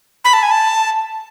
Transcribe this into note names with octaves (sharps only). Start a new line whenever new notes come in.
B5
A5
G#5
A5